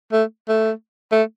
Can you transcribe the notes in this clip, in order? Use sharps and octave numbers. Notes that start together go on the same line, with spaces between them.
A3
A3
A3